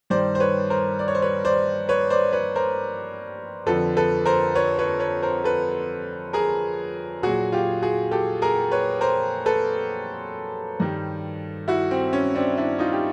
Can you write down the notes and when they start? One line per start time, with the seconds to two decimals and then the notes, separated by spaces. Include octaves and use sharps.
0.10 G2 D#3 G3 C5 D5
0.35 C5
0.40 B4 C#5
0.70 A#4 C5
0.99 D5
1.08 C#5
1.15 C5
1.22 B4 C#5
1.45 C5 D5
1.89 B4 C#5
2.10 C5 D5
2.33 B4 C#5
2.56 A#4 C5
3.66 F2 D3 F3 A4 B4
3.97 A4 B4
4.26 A#4 C5
4.55 B4 C#5
4.79 B4 C#5
5.00 B4 C#5
5.23 A#4 C5
5.44 A4 B4
6.33 G#4 A#4
7.23 A#2 F#3 F#4 G#4
7.52 F4 G4
7.82 F#4 G#4
8.11 G4 A4
8.42 G#4 A#4
8.71 B4 C#5
9.01 A#4 C5
9.46 A4 B4
10.80 G2 D#3 G3
11.68 E4 F#4
11.91 C4
12.13 C#4
12.34 C4 D4
12.57 D4 E4
12.79 D#4 F4
12.93 G4